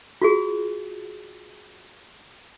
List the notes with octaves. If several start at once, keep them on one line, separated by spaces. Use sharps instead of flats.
F4 F#4 G#4